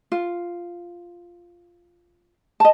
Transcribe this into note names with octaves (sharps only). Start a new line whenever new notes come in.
F4
D#5 A5